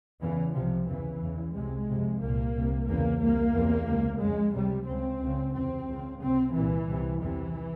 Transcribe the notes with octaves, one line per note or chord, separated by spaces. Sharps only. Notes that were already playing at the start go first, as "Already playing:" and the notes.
E2 C#3 E3
C2 C3 F3
E2 C#3 E3
E2 C#3
C2 C3 G#3
F2 C3
C2 A#2 A#3
C2 C3
E2 C#3 A#3
C2 C3 A#3
E2 C3
C#2 C3
F2 C#3 G#3
C#2 C3 G3
C#2 C#3 C4
C#2 C#3
E2 C3 C4
C#2 C#3
C#2 C3 C4
C2 A#2 E3
C2 C3
E2 C3 E3